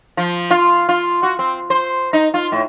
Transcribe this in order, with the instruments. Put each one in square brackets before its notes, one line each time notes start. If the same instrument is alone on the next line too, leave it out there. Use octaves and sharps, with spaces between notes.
[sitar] F3
F4
F4
F#4
C4
C5
D#4
F4
A2